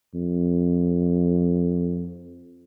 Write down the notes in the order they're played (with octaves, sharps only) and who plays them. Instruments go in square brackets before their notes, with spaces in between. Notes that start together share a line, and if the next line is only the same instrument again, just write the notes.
[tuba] F2